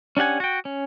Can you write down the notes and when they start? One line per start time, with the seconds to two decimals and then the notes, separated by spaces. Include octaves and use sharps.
0.17 C#4 D4 G4 F#5 G#5
0.40 F#4 G5
0.65 C#4